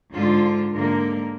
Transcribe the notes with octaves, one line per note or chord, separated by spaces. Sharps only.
G#2 D3 D4 F4
G#2 D3 A#3 A#4